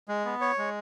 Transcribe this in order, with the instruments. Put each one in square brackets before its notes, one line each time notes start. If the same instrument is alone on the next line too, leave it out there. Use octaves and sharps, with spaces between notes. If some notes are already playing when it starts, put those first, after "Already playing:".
[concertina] G#3
B3
C#5
G#3